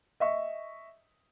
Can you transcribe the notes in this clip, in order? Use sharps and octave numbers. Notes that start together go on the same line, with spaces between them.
D#5 E5 C#6